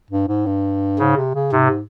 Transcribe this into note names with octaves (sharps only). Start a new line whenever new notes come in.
G2
G#2
G2
G#2 C#3
C3
C#3
G#2 C3